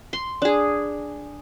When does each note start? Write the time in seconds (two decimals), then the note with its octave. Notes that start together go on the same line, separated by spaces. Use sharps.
0.13 C6
0.42 D4 G#4